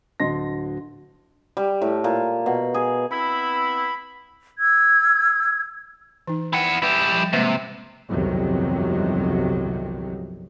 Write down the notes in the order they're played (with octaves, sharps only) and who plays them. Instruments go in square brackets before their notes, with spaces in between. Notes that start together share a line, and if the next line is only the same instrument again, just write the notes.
[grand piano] D1 D3 D#5 C6 A#6
[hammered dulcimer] G3
A2
A#2
B2
G#4
[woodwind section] B3 C4 E4 [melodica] B5
[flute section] E6 G#6
[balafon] E3 D#4
[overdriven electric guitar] E4 F#5 [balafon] G5
[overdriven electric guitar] E4 G4 [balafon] B4
[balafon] F3 G3
[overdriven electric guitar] C3 [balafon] G#3 A#3 B4
[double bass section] G1 C2 F2 C3 D#3 F#3